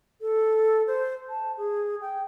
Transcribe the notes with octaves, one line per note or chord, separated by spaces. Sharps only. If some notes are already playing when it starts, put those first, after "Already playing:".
A4
C5
A5
G#4
G5